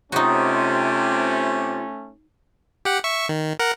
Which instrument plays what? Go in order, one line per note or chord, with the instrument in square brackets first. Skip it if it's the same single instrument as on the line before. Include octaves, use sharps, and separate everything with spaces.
[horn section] C3 [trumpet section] A3 C#4 [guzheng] D#4 F#4 [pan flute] F4
[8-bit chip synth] G4 F#5
E5 C#6
D#3
A#4 F#5